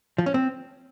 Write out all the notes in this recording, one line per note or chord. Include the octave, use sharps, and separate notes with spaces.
F3
C#4
C4